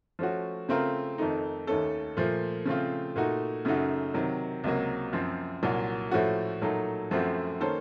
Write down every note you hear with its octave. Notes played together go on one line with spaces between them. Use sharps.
F3 A3 C#4 F#4
C#3 A3 C4 F4 A#4
F2 D#3 A3 D#4
D#2 D#3 A3 C#4 A4
A#2 F3 A3
C#3 F3 A3 C4 F4
A#2 A3 D#4 F#4
F#2 C#3 A3 D#4 F#4
C3 D#3 F#3
C#2 C3 F#3 A#3
F#2 F3 C4
C2 A#2 F#3
A2 F3 A3 C#4 F#4
A#2 F#3 A3 D#4 A4
F#2 F3 A3 C4 F#4
D#3 A#3 C#4 A4 C5